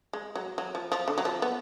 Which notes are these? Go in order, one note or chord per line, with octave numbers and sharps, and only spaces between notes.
G#3
F#3
F#3
F3
F3
D3
F#3
F3
B3